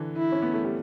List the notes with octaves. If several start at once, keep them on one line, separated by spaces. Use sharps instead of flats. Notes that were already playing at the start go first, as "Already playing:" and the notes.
Already playing: D3 E3
E4
C#4
B3
A3
G3